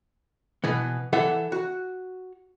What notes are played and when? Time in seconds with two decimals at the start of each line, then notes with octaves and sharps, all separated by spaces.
0.64 B2 E3 B3
1.13 E3 A4 E5 F#5
1.52 F#4